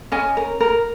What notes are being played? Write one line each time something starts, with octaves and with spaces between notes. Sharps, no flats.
C#4 D#5 G#5
A#4
A#4